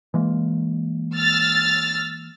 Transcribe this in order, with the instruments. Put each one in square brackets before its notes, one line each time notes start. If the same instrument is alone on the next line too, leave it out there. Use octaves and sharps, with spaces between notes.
[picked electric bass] E3 G#3 A#3
[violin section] E6 F6 A6